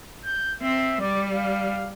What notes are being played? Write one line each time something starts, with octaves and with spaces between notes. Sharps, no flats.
G6
C4 E5
G3 D5
F5